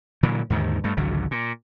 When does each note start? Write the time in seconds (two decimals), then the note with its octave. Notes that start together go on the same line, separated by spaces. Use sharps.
0.23 A#2 D3 E3 F#3
0.50 D#2 G#2 D3 D#3
0.84 G2 A3
0.97 G#1 C#2 D3 F#3
1.31 A#2